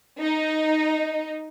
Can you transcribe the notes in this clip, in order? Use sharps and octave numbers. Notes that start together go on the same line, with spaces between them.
D#4